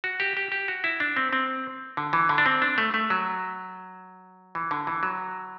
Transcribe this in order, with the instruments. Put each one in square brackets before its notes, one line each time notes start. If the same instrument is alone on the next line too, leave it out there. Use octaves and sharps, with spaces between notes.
[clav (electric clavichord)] F#4
G4
G4
G4
F#4
E4
D4
C4
C4
D3
E3
D3
D4
C4
D4
A3
A3
F#3
E3
D3
E3
F#3